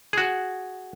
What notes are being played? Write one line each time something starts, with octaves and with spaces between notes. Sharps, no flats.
F#4 G#4